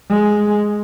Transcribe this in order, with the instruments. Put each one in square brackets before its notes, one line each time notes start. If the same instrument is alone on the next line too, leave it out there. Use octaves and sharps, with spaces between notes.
[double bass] G#3